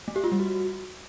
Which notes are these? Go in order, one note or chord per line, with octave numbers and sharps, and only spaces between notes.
A3
G4
F4
G3
F#4